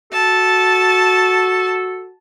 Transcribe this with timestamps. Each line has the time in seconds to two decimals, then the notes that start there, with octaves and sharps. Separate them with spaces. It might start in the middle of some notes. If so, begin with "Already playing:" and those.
0.13 F#4 A4 A5